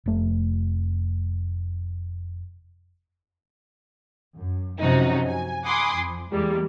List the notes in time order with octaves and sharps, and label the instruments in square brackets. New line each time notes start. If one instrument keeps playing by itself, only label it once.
[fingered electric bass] F1 A3
[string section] F#2
F#2 C3 F3 C#4 D#4 F#4
G#5
F#5 G#5 B5 C6 D6 D#6
F2
E2 G3 G#3 A#3